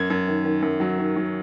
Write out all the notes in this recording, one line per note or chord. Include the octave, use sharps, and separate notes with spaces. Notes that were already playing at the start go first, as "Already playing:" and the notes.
Already playing: F#2 G#6
F#2
D#3
D#3
F#2
F#3
D#3
F#3